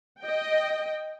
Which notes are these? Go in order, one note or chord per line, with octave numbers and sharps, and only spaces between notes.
D#5 G5